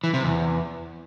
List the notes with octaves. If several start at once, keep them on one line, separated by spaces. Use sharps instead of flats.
E3
C3
E2